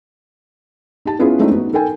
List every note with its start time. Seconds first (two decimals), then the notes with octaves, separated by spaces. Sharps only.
1.05 D#4 G4 A5
1.19 B3 C#4 E4 F4 G#4 B4
1.39 G#3 A3 C4 D4 D#4 F4
1.51 B3 D#4 F#4
1.73 D#4 A4 A#4 G5 G#5